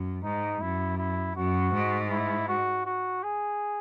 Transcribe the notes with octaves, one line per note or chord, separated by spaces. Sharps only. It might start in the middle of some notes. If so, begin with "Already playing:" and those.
Already playing: F#2
G#2 D#4
F#2 E4
E4
F#2 F#4
G#2
E4
F#4
F#4
G#4